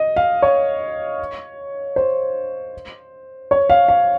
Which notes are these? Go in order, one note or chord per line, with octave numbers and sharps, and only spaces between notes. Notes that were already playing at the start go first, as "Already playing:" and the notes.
Already playing: D#5
F5
C#5
C5
C#5
F5
F5